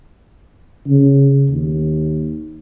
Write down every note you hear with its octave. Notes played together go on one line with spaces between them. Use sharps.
C#3
D#2